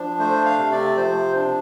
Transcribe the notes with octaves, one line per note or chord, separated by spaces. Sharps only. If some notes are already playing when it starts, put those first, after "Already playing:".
Already playing: F3 D4
A3 C5
F5
C3
D5
F3 C5
D4